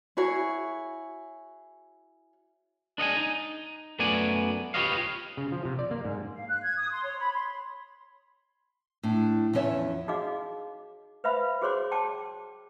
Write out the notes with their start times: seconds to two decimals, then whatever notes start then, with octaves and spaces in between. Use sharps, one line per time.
0.17 E4 F#4 G#4 C#5
2.98 D4 D#5 F#5 G#5
3.17 D#4
3.99 F#2 A3 B3 F#4 D5 G#5
4.74 F4 G4 B4 C#5 D#5 F5
5.37 C#3
5.52 F3
5.65 C3
5.79 D5
5.91 A#3
6.05 G#2
6.34 F5
6.48 F#6
6.63 G#6
6.77 D#6
6.91 C6
7.04 C#5
7.19 B5
7.33 C6
9.03 A2 D4
9.53 E2 F3 C#4 C#5 D#5 E5
10.08 D#4 F#4 G#4 D#5 F5 D6
11.24 B4 C5 E5 F5 B5
11.62 F#4 G#4 C5 C#5 C6 D6
11.92 G5 A5 D6